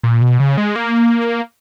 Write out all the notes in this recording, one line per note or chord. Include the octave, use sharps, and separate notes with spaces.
A#2
B2
C#3
G#3
A#3